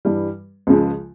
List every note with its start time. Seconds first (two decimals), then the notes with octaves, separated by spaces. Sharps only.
0.05 G2 E3 G3
0.67 C#2 C#3 F3 G#3